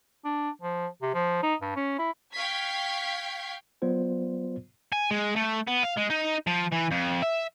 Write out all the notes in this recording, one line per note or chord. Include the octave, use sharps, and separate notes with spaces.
D4
F3
C3
F3
D#4
G2
C#4
E4
F5 G5 C#6 G#6 B6 C7
F#3 B3 F4 C5 D5
G#5
G#3
A3
B3
F5
G#3
D#4
F3
E3
F2
E5